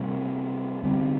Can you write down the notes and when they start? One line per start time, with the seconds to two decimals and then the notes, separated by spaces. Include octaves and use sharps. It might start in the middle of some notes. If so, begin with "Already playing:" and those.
Already playing: C3 G3 A#3
0.83 D3 G3 C4